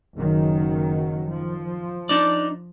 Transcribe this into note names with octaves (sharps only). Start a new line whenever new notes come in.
F#1 D#3 F#3
F3
D4 D#4 D5